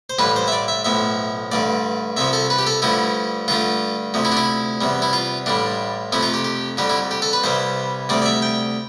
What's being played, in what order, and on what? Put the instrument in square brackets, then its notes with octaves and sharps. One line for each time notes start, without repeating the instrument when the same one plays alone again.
[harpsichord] C5
A1 A2 E3 G3 B4
C5
E5
D5
E5
B1 A2 F3 E5
A1 G2 D3 D5
C2 C3 F3 E5
A4
B4
G4
A4
G2 D3 F3 A3 E4
G2 D3 A3 F4
D2 C3 F3
E4
D4
E4
E2 C3 G3
E4
F4
A1 A2 G3 D4
F2 C3 F3 A3 E4
F4
G4
G4
F2 D3 G3 G4
E4
G4
A4
B4
C2 C3 E3 G3 C5
D2 C3 G3 D5
D5
E5
G5